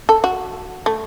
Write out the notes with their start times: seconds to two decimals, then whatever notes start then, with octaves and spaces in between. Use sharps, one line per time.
0.09 A4
0.24 F#4
0.86 A3